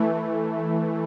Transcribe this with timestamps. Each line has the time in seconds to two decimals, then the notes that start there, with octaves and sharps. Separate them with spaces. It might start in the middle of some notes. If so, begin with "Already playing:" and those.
Already playing: E3 A3